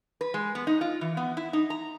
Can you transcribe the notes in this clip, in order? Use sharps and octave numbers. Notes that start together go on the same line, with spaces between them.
B4
G#3
B3
D#4
F4
E3
B3
E4
D#4
A#5